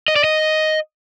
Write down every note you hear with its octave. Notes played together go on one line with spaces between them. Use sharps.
D#5
D5
D#5